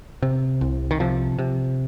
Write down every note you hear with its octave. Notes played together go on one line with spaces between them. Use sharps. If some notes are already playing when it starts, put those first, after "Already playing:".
C3
C2
D#3
C3 F3
C3